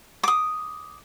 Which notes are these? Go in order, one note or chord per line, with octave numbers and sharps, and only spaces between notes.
D6 D#6